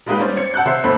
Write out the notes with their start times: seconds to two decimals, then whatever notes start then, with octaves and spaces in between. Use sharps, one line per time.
0.06 G3 G#3 A#3 D#4 G4 B4
0.20 G3 C#4 C5 D5
0.37 C4 D5 G#6 C#7
0.54 F#5 A5 E6 F#6 G6
0.66 C3 C5 E5 C7
0.84 G#1 D#2 A3 C4 C5 B5